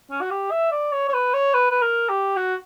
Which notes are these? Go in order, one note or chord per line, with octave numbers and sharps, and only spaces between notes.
C#4
F#4
G4
E5
D5
C#5
C#5
B4
C#5
B4
B4
A#4
G4
F#4